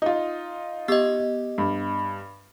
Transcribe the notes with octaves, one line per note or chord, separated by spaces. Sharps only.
D#4 F4
B3 G4 D#5
G2